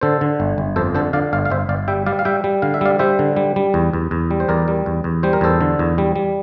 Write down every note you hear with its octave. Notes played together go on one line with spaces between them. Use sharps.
D3 A4 C5
D3
G1
G1
F2 A4 C5
D3 A4 C5
D3 D5 F5
G1 D5 F5
F5
G1 C5 E5
G1 D5 F5
G3 E5 G5
G3 D5 F5
F5
G3 E5 G5
G3
D3 F5
E5
G3 D5 F5
G3 C5 E5
D3
G3
G3
E2
E2
E2
G3
C5
E2 A#4 D5
G3
E2
E2
G3 C5
A#4
E2 A4 C5
D3
E2
G3
G3